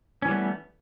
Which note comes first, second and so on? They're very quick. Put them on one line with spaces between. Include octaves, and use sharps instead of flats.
C#4 E3 G3 B3 A3